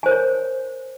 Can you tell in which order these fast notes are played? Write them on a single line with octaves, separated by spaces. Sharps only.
G#5 C5 A#4 C#5